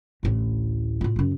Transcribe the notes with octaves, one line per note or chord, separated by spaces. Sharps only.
A1 D2
A2 F4
F#2 C#3